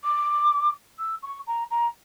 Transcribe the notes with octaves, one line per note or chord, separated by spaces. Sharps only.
D6
E6
C#6
A#5
A#5